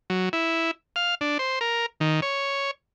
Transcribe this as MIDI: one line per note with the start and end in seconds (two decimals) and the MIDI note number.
0.10 0.29 54
0.33 0.71 64
0.96 1.15 77
1.21 1.38 62
1.39 1.59 72
1.61 1.86 70
2.00 2.20 51
2.22 2.71 73